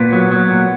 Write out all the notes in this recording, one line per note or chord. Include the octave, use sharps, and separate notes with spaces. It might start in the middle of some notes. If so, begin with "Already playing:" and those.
Already playing: A#2 B3
F#3
F#3
A#2